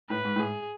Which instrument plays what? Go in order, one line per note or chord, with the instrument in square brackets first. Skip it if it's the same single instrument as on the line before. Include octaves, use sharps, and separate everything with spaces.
[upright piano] A2 [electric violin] B4
[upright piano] G#2
A2
[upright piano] G#2 [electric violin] G#4